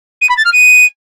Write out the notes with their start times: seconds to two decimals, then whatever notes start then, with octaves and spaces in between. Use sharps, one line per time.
0.21 D#7
0.29 B5
0.37 A6
0.45 F6
0.52 D#7